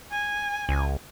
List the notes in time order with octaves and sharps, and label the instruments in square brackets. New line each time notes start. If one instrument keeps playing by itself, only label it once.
[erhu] G#5
[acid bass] C#2